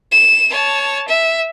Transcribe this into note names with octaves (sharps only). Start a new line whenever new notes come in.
E7
C#5 A5
E5